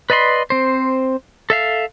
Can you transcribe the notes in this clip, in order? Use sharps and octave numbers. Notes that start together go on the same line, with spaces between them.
B4 D5 D#5 B5 C6
C4 C5
A4 E5 F5